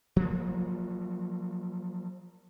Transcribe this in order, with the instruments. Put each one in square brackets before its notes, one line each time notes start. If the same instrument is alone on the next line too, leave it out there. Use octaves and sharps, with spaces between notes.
[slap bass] F3 F#3 A#3